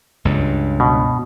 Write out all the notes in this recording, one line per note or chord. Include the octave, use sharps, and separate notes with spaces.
C#2 G2
B2